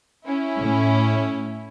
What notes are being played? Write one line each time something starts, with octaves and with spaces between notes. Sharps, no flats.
C#4 E4
A2